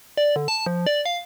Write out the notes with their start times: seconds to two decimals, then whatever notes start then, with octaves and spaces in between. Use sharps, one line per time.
0.17 D5
0.36 D3
0.48 A5
0.66 F3
0.86 D5
1.06 F5